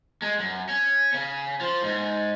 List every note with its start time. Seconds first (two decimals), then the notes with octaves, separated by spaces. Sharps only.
0.22 G#3
0.39 F#2
0.69 C#4
1.14 C#3
1.61 F3
1.83 G#2